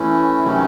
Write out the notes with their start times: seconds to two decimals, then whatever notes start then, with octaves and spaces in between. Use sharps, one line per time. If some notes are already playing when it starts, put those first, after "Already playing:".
Already playing: E3 A3 C#4 E4
0.43 C3 D#3 F#3 A3 C#4